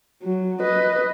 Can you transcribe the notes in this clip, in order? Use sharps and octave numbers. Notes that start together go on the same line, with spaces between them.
F#3
B4 D#5